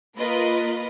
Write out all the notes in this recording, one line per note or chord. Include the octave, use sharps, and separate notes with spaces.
A#3 F4 A#4 B4 D#5